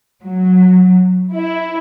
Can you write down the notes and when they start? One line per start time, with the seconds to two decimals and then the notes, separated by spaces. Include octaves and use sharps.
0.23 F#3
1.35 E4